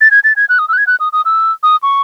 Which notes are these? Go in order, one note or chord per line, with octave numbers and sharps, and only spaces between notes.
A6
G#6
A6
G#6
F#6
D#6
E6
F#6
G#6
F#6
D#6
D#6
E6
D#6
C#6